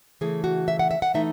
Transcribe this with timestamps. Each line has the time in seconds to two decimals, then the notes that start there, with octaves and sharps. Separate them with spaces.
0.21 C#3 E3 A3 G#4
0.44 F#4
0.68 E5
0.79 F#5
0.91 E5
1.02 F#5
1.14 E3 A3 D#4 E5